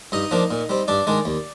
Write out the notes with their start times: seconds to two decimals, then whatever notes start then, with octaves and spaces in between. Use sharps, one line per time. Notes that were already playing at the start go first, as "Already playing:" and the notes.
0.12 G2 D#4 D#5
0.31 F3 A#3 D4
0.51 A#2
0.69 G3 C4
0.88 G2 D4 D5
1.07 D#3 G#3 D4
1.25 D#2